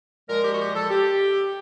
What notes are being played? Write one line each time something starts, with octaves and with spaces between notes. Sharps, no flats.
A#2 F3 G#3 A#4
G4
F#4
G4
A4
G4